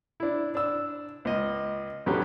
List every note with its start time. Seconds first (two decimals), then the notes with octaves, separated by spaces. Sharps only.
0.20 D4 E4
0.55 D4 E6
1.25 C#2 D#5
2.06 F2 D3 F#3 C#4 G4 B4